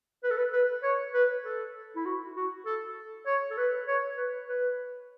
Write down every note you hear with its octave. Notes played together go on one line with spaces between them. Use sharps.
B4
A4
B4
B4
C#5
B4
A4
E4
F#4
F#4
A4
C#5
A4
B4
C#5
B4
B4